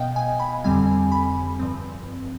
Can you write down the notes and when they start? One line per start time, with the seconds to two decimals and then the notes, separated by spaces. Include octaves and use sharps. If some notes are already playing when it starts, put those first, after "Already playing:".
Already playing: B2 B3 D#5 F5 G5
0.16 G#5
0.40 B5
0.64 F2 D3 G3 C4 G#5
1.12 B5
1.59 G2 F3 C4